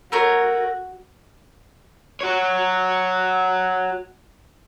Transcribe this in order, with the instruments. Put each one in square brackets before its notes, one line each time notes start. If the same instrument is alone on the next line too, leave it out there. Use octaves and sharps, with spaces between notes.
[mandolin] A3 A#4 C#5 [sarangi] F#4
[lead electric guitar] F#4 C#5